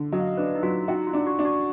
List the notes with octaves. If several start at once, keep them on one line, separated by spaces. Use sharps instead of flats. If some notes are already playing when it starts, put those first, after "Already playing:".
Already playing: D3
F#3 D#5
F5
D#5
D4 B4
D#4
F#3 F4
D#4 F#4
F4
D4
F#4
D4
F#4